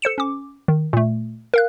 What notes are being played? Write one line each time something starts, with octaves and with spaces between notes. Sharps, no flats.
A4 C5 C#7 E7
C#4 D6
D#3
A#2 A3
A#4 F5 F#6